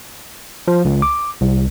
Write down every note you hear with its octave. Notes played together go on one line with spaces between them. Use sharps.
F3
C#2
D6
C2